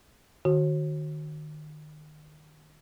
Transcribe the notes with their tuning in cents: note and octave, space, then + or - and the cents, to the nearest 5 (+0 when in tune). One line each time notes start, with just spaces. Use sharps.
D#3 -40 F#4 +0